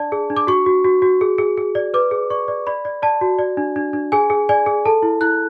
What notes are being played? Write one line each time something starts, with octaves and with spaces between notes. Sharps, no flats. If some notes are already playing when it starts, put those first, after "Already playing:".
Already playing: D4 D5 A5
G#4
D4
D6
F#4 C#6
F#4
F#4
F#4
G#4
G#4
G#4
D5
B4 D6
G#4
D5 C#6
D5
D5 B5
D5
D5 A5
F#4
D5
D4
D4
D4
G#4 G#5
G#4
D5 G#5
G#4
A4 A5
E4
E4 F#6